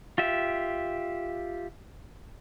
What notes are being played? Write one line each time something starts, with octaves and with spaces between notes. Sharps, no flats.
F4 G4 E5